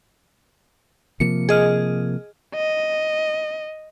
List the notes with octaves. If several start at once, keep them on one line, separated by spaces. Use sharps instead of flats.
C3 F3 A#3 C#7
G#4 D#5 F6
D#5